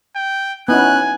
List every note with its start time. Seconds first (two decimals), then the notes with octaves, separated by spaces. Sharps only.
0.16 G5
0.68 B3 C#4 D#4 E4 G#5 F#6